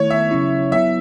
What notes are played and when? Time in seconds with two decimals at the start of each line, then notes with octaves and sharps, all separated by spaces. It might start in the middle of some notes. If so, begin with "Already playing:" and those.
Already playing: D#3 A3 E4 C#5
0.10 E5
0.31 C#3 F#3 C#4 E4
0.72 F#3 B3 E4 E5